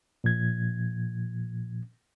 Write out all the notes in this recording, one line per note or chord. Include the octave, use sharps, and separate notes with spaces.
A#2 F3 G#6